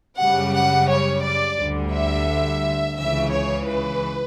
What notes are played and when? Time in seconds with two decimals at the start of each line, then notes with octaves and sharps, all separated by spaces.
0.19 F#2 C#3 G3 F#5
0.55 F#5
0.89 C#5
1.24 D5
1.58 D2 D3 G3
1.93 E5
2.97 C#2 C#3 E3 E5
3.32 C#5
3.67 B4